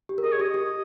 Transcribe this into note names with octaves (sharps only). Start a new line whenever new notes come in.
G4
A#4
G#4 D#5
C#5
G4 D#5
G4